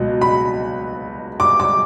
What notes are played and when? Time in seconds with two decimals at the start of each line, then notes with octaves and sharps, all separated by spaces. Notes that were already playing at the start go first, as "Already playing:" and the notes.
Already playing: C#2 B2 F#3
0.21 B5
1.40 D6
1.60 D6